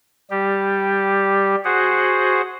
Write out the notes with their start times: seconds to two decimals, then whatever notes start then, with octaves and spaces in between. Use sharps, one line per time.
0.30 G3 G4
1.65 F#4 G#4 C5 F#5